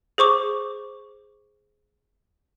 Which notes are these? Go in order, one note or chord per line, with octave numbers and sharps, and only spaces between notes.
G#4 C5 C#6 D6